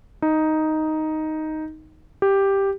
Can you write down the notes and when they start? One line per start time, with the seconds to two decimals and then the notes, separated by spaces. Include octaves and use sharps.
0.22 D#4
2.22 G4